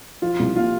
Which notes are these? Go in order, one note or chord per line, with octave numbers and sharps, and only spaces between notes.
F3 F4
C2
A#3 F4